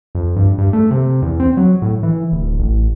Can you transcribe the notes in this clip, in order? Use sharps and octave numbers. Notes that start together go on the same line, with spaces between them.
F2
G2
G2
A3
C3
E2
C4
F#3
A2
E3
D1
A1